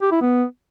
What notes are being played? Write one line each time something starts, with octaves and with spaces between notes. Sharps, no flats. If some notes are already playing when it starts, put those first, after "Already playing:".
G4
E4
B3